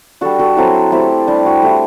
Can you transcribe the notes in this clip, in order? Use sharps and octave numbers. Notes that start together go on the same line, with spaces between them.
G3 D4 F#4 A4
F#4 A4
F#3 C4 E4 F#4 A4
A3 C4 E4 G4
G3 D4 G4
F#4
A3 E4 G4